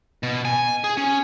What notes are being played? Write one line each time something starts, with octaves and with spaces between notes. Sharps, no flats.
B2
G#5
G#4
C#4